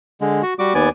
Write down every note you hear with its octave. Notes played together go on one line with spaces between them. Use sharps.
D3 G#3
F#4
G3 F#4 D6
D#2 B3 D5 G#5